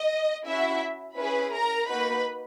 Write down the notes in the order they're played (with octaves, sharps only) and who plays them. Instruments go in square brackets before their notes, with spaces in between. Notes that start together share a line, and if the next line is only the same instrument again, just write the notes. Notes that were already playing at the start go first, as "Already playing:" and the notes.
Already playing: [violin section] D#5
C#4 E4 F#4 E5
C#4 E4 G#4 B4 B5
A#4 A#5
A#3 D#4 F#4 B4 B5